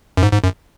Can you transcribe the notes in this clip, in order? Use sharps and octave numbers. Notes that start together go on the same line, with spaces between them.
F#2
G#2
G#2
F#2